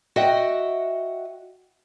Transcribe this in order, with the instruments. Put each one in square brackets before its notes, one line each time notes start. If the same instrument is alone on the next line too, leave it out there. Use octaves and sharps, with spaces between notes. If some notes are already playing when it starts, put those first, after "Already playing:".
[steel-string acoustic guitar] F#4 D#5 E5 F#5 G5